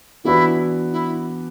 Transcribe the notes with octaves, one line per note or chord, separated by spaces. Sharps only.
E3 B3 D4 E4 F#4 B4
E4